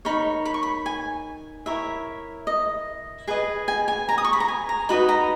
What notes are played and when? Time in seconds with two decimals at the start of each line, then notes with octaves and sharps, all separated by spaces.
0.05 D#4 A#4 C#5 B5
0.45 B5
0.54 C#6
0.63 B5
0.86 G#5
1.66 E4 A#4 C#5 E5
2.47 D#5
3.27 G#4 B4 D#5 G#5
3.68 G#5
3.88 G#5
4.09 A#5
4.18 D#6
4.25 C#6
4.33 B5
4.40 A#5
4.48 G#5
4.69 A#5
4.89 D#4 F#4 B4 D#5 B5
5.09 A#5